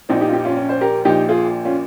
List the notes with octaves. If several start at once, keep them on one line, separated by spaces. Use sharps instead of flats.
A#1 A#2 F3 C4 D#4
D#4 G4
F4
D#4 G4
C#4 F4
C#4
C5
G4 A#4
A#1 A#2 F3 D#4 G4
F4 G#4
C#4 F4